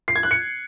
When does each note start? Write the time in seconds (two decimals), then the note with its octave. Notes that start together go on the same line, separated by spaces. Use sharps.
0.08 C7
0.16 G#6
0.23 F#6
0.31 C#7